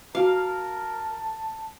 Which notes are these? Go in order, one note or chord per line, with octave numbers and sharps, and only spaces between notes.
F#4 A#4 F5 A5